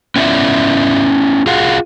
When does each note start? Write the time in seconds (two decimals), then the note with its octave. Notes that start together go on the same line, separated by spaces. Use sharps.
0.16 B3 C#4 E4 F#4 D5 E5
1.46 F4 G#4 F5 F#5